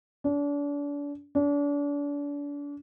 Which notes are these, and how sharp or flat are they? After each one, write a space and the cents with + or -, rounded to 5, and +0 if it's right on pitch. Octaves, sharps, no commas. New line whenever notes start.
D4 -35
D4 -35